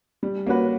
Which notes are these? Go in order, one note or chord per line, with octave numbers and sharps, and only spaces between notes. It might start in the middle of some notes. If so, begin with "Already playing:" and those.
G3
A#3 C#4 F#4 B4